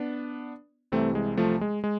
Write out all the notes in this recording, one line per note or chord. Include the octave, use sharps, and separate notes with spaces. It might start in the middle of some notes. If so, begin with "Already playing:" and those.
Already playing: B3 D4
C2 C3 E3 A3 C4
G#3
F3 A3
G#3
G#3